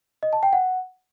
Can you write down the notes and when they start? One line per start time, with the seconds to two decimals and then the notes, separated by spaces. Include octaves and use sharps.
0.23 D#5
0.33 A5
0.43 G5
0.53 F#5